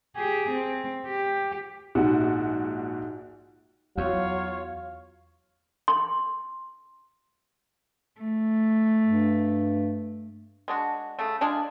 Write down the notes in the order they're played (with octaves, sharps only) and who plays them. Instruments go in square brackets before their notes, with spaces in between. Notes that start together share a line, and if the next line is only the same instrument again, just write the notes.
[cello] G4 G#4
C4
G4
[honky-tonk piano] A#1 G#2 F#4
[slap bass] E2 [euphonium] F#3 [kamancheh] F4 C#5 [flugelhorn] F5
[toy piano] C6
[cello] A3
[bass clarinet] G2
[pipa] G#3 D4 F#4
C#3 A3
G#3 D4 F4 G#4